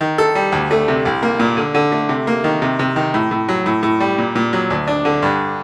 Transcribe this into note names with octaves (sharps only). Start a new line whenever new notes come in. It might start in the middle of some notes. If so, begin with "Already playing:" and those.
D#3
A4
G3
D2
A3
C3
C2
A#3
A#2
D3
D3
A3
C3
A#3
D#3
C3
C3
D#3
A2
A2
F#3
A2
A2
G3
A#2
A#2
F#3
D2
D4
D3
G2